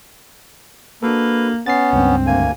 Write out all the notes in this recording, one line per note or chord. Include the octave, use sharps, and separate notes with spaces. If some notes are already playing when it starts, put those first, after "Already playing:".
A#3 D4 F#4 A4 B4
B3 C#4 A6 C7
C#2 G2 C4
D2 A#3 G#5